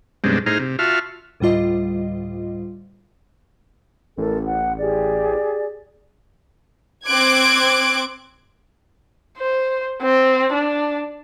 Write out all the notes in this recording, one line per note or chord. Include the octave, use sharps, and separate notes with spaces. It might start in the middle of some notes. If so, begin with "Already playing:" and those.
F#2 B2 G3 G#3 C4 D4
A2 D#4 G#4 C5 A#5 F6
C3
F4 F#4 E5 A5 F6
D2 A2 G3 F4 D#5
A1 A4 A#4
F#5
G4 G#4 D5
C4 D6 F#6 G#6 D7
C5
C4
D4